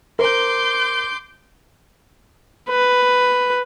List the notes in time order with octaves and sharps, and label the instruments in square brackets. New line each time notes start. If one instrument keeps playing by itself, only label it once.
[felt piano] A#4 C5 [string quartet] C6 D6 G6
[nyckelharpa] B4